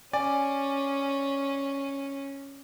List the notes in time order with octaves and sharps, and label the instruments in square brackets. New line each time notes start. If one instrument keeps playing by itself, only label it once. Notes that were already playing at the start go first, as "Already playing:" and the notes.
[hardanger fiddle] C#4 [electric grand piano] D5 [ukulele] G#5